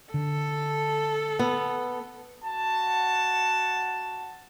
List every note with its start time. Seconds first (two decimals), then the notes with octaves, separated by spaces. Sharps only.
0.14 D3 A4
1.39 B3
2.42 F#4 F#5 A5